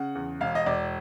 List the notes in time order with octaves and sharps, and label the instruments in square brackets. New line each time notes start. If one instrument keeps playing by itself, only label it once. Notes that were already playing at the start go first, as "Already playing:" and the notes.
Already playing: [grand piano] C#3 F#5
E2
E1 F5
D#5
E1 D5